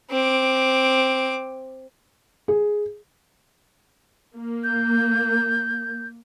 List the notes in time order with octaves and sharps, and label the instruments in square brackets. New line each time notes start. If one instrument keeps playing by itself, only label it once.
[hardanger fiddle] C4 D6
[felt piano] G#4
[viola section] A#3
[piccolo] G6